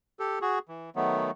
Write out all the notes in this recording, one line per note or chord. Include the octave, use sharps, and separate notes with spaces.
G4 A4
F#4 G#4
E3
D#3 F#3 A3 B3